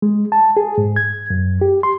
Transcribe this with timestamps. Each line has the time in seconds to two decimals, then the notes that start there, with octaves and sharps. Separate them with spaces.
0.02 G#3
0.32 A5
0.57 G#4
0.78 G#2
0.96 G#6
1.30 F#2
1.61 G4
1.83 C6